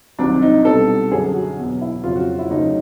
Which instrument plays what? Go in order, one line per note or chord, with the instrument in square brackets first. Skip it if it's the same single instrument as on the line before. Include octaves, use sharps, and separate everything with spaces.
[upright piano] C2 C3 D#3 F#3 D4
D#4
C2 B2 G3 A4
F#2 D3 F#3 G#4
F#4
E2 B2 F#3
E4
F2 C#3 F#3 F4
F#4
E4
D2 C#3 F#3 D#4